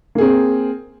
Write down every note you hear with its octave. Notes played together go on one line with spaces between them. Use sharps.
A#3 C4 G#4